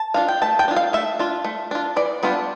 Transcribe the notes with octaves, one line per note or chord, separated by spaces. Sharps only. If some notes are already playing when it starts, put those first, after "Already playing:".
Already playing: A5
D4 F4 F5
G5
A3 A5
G5
D4 F4
F5
A3 E5
D4 F4
A3
D4 F4
E3 D5
G3 B3 D4 F4